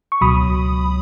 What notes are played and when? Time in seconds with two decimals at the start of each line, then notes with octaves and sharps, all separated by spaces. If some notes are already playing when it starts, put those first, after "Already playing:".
0.12 C#6
0.21 C#2 B2 F#3 B5 D#6